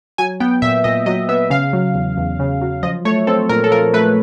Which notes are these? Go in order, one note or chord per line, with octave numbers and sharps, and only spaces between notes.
F#3 G#5
B3 G5
A#2 E5
A#2 D#5
F#3 D#5
B3 E5
C#3 F5
F#3
E2
E2
C#3
F#3
F3 D#5
A3 C#5
C4 A4
A#2 A#4
A4
F3 A#4
A3 B4